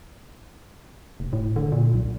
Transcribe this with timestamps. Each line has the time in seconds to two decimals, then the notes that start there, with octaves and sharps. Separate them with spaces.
1.20 F1
1.33 A2
1.56 D3
1.72 A#2
1.94 B1